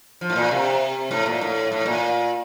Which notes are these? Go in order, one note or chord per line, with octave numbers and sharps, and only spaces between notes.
F3
A2
A#2
C3
A2
A#2
A2
A2
A#2